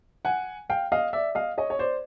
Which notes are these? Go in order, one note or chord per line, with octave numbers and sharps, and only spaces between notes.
F#5 G#5
F5 G5
D#5 F5
D5 E5
D#5 F5
C#5 D#5
C#5
C5 D5